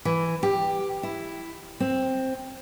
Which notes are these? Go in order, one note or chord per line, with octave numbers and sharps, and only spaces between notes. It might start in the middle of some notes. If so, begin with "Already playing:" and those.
E3
G4
E4
C4